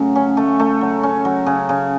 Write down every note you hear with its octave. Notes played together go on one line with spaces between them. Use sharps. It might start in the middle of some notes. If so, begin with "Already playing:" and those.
Already playing: C#3 F#3 A3
C#4
A3
A3
F#3
C#4
F#3
C#3
C#3